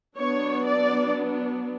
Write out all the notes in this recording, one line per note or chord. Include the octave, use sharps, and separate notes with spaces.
F#3 B3 D4 C#5
D5